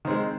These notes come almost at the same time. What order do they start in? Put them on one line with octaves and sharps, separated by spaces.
D#3 C4 G#3